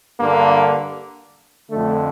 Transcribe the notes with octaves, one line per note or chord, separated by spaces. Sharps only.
G2 D3 A#3
F2 D3 A3